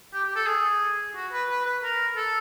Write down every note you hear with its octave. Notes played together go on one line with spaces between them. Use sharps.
G4
G4
A4
G#4
F#4
B4
B4
B4
A#4
A4